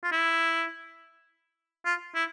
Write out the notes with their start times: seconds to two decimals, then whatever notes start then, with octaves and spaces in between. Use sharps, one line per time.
0.03 F4
0.12 E4
1.85 F4
2.15 E4